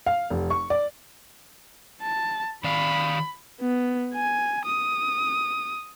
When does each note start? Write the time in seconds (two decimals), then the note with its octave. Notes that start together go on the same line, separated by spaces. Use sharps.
0.06 F5
0.30 F1
0.50 C#6
0.70 D5
2.02 A5
2.64 D#3 D5 F5 B5
3.61 B3
4.14 G#5
4.65 D#6